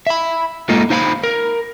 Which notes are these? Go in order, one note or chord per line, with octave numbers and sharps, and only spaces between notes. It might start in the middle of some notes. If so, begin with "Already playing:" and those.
E5 B5
G#3 A#3 D#4 F4 A4
D#4 C5 F5 A#5 B5
A#4